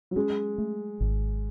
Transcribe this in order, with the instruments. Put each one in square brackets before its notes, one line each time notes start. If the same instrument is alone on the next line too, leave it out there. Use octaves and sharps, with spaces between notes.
[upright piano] F#3
[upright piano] G#3 [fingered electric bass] C#4
[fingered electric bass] A3
G#1